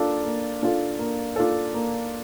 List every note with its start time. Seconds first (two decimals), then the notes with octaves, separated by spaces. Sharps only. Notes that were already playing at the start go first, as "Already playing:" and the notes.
Already playing: A#3 D4 F4 A4
0.25 A#3
0.63 D4 F4 A4
0.99 A#3
1.36 D4 F4 A4
1.74 A#3